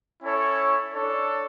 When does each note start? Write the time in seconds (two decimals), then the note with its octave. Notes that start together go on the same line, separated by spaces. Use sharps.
0.23 C#4 E4 A4 C#5
0.92 D4 A4 C#5